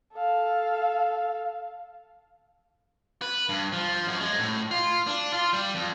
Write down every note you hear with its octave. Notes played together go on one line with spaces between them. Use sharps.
A4 F5
B4
G2
F3
F#2
G#3
A2
F4
D4
F4
G3
F2